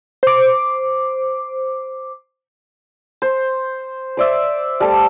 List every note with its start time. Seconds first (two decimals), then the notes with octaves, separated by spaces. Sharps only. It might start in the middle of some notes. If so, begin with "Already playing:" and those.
0.23 C5 D6
3.22 C5
4.17 C5 D5 E5
4.80 G3 A3 A4